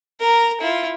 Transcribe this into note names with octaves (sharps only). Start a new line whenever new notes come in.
A#4 A#5
E4 F4